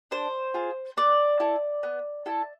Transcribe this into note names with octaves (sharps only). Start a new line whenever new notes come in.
D4 C5
F4 G#4
B3 D5
E4 A4
B3
E4 A4